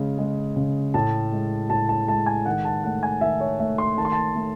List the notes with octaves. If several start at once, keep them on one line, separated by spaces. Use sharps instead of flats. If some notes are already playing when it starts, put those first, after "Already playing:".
Already playing: C#3 G#3
G#3
C#3
A2 A5
G#3
A2 A5
A5
G#3 A5
G#5
D#3 F#5
A5
A3 F#5
G#5
D#3 E5
C#5
A3 E5
C6
D#3 A5
C6
A5
A3